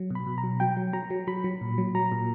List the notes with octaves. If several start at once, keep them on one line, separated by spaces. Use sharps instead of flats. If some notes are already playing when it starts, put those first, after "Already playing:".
Already playing: F#3
B2 B5
B2
A#5
F#3
F#3 G5
F#3
F#3 A#5
F#3
F#3 B5
F#3
A#2
F#3
F#3 A#5
A#2